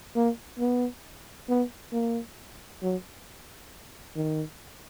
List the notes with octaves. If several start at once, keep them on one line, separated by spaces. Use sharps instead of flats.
A#3
B3
B3
A#3
F#3
D#3